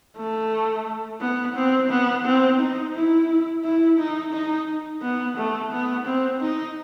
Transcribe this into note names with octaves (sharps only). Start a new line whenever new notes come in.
A3
B3
C4
B3
C4
D#4
E4
E4
D#4
D#4
B3
A3
B3
C4
D#4